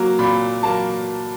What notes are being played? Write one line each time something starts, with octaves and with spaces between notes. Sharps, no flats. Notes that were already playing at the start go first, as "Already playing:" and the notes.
Already playing: F#3 A#3
A#2 B5
F#3 A#3 A5